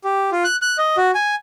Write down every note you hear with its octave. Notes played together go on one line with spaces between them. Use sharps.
G4
F4
F#6
F#6
D#5
F#4
G#5